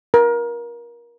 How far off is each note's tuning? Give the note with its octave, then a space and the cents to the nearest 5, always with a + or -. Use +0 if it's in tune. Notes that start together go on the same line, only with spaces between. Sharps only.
A#4 +25